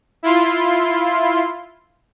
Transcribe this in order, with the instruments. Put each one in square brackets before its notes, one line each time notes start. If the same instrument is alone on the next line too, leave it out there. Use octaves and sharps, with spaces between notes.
[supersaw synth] E4 F4 C6